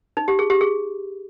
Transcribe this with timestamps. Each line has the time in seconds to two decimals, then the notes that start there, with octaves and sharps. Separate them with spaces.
0.17 D#4
0.28 G4
0.39 G#4
0.50 G4
0.61 G#4